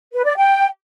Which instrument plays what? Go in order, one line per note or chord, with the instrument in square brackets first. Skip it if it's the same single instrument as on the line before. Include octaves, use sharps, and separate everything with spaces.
[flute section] B4
D5
G5